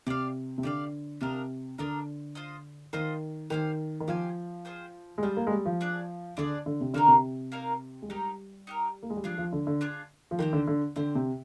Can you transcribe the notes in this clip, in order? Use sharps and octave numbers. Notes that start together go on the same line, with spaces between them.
C3 G4 D5 F5
C3
D3 G4 D5 F5
C3 D4 F4 A#4 D#5
D3 D4 F4 A#4 D#5
F4 C5 D#5
D#3 F4 C5 D#5
D#3 G4 C5 F5 G#5
D#3
F3 G4 C5 F5 G#5
F4 G#4 C5 G5
G#3
G3 F4 G#4 C5 G5
A#3
G#3
G3
F3
D4 G#4 D5
D3 D4 G#4 D5
D3
C3
D3 A#3 D#4 A#4 F5
C3
A#3 D#4 A#4 F5
G#3
G3 D#4 G4 A#4
D#4 G4 A#4
A#3
G#3
G3
F3 D4 F4 G#4
F3
D3
D3
D4 F4 G#4
F3
D#3 C4 G4 C5
D3
D3
D3 C4 G4 C5
C3